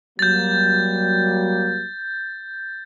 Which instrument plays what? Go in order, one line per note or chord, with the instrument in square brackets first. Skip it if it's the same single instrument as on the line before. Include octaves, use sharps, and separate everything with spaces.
[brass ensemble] F#3 G3 A#3 [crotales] G6 A6